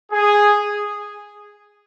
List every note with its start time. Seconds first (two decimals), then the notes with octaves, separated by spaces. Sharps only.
0.11 G#4